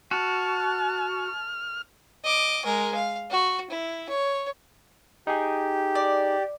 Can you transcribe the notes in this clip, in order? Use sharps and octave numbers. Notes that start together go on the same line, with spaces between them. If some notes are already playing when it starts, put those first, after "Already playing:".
F#4 A5 F6
D#5 D6
G#3 A#4
F5
F#4
E4
C#5
D#4 G4 G#4
D5